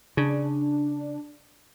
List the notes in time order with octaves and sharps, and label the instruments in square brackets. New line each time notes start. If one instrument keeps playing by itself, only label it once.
[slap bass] C#3 [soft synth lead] D4